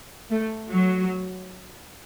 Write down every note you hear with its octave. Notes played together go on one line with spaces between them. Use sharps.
A3
F#3